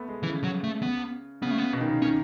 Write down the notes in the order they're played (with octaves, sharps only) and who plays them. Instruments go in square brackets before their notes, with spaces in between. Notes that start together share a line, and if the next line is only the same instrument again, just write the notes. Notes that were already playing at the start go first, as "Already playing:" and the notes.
Already playing: [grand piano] A3 B3
G#3
[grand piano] C#3 [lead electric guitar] E3
[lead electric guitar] F#3
A3
B3
[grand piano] C#3 [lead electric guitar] B3
[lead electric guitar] A3
B3
[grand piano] B2
D#3
C#3
[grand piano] D#3 [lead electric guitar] C#4